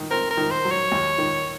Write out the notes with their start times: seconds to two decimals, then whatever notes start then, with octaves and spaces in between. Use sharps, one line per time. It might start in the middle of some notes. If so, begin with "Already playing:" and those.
Already playing: D#3
0.10 C4 A#4
0.31 A#4
0.37 D#3
0.51 C5
0.65 F#3
0.72 C#5
0.92 D#2
1.18 D#3